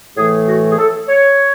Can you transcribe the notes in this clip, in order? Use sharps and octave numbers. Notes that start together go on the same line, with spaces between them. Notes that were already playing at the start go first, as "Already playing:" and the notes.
A2 E3 A3 G#4
F#4
G#4
A4
C#5